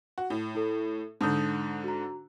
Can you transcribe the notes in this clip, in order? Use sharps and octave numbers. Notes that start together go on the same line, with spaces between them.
F#4
A2
E4 A4
G#2 D3 A5 D#6 G6
F#4 A#5